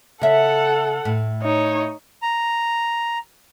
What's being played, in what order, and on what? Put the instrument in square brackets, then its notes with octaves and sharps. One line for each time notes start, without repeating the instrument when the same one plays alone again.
[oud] C#3 E5 [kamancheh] A4 F#5
[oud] A2
[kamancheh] D#4 C#5
[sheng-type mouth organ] A#5